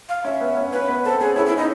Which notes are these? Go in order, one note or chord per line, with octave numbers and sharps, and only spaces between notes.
F5
C#4 E5
B3
C#4
C#4 B4
B3
C4 A4
C4
C#4 G#4
C#4 E4
E4
C#4
D#4